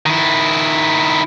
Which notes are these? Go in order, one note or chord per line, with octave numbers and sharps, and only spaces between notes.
D#3 E4